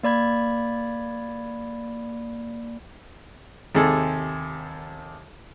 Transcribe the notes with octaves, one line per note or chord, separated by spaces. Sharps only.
A#3 D5 B5 G#6
D#2 C3 G#4 A4